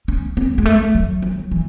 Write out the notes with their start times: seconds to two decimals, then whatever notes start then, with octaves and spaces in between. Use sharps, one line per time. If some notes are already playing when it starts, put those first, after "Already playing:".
0.08 C#4
0.37 C4
0.58 G#3
0.65 A3
0.95 F#3
1.22 F#3
1.52 E3